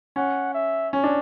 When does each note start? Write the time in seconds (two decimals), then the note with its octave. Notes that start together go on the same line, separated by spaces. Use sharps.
0.16 C#4 F#5
0.54 E5
0.93 C#4
1.04 D4